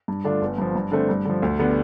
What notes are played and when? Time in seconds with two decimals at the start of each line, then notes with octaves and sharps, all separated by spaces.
0.08 G2
0.24 D3 A3 D4 F4
0.42 G1
0.58 G2 F3
0.75 G2
0.92 D3 A3 C4
1.09 G2
1.25 D3 F3
1.42 D2
1.59 D3 G3 B3